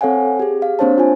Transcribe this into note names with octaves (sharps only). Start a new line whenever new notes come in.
C4 A4 C#5 F5 F#5 G#5
G4 G#4
F5
A#3 C4 D4 C5 C#5 A5
F4 G#5